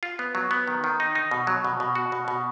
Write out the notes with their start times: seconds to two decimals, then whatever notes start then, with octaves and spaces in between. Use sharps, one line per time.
0.03 F4
0.19 B3
0.35 F#3
0.51 B3
0.68 D#3
0.84 D#3
1.00 D#4
1.15 D#4
1.31 B2
1.47 F#3
1.65 B2
1.80 B2
1.95 F#4
2.12 B2
2.28 B2